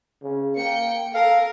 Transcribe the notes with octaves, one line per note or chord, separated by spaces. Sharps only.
C#3
A#3 G5 C#7
A4 A#4 F5